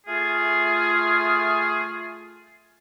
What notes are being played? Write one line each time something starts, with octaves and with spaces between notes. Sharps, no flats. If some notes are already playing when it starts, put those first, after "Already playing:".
A3 F4 G#4